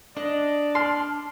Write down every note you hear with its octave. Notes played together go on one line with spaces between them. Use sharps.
D4 D5 D#5
A5 C6 F6